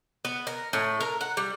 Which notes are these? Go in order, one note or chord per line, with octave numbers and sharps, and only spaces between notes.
B3
A#4
A2
A#4
F#5
G3